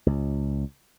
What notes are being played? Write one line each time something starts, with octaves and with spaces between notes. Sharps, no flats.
C#2